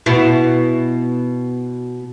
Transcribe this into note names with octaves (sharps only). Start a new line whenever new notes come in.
B2 E4